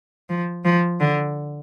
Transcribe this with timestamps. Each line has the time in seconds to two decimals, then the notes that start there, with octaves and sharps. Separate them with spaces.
0.29 F3
0.65 F3
1.00 D3